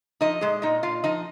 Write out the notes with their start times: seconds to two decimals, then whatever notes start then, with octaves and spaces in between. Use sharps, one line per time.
0.21 F3 D#4 D#5
0.41 A#2 G#3 G#4
0.62 A#2 D#4 D#5
0.83 A#2 F4 F5
1.04 F3 D#4 D#5